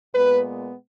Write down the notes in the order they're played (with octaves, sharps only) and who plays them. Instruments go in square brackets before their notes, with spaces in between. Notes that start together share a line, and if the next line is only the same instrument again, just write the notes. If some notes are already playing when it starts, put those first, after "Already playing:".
[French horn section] A#2 G#3 B3 B4